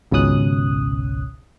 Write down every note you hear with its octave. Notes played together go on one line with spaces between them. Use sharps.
G#1 C#2 B2 C#4 D#6 F#6